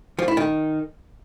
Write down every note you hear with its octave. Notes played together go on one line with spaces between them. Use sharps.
F3
E4
D#3